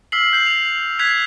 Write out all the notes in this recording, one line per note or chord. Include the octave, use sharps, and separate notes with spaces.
E6 F6 B6 C7 F#7
G6 C7
F7
F#6 G#6 B6 C7 F7